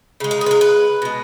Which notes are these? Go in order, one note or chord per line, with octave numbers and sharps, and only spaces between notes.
C#3 G#3
A#4
G#4
B4
A#4
B4
B2 G#3